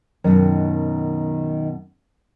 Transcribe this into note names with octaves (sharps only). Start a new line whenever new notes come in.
F#2 B2 D#3